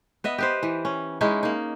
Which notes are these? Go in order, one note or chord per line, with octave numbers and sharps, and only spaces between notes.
B3 D#5 E5
G4 B4 C5
E3
C#4
G#3 C#4 D#4 E4
A#3 D#4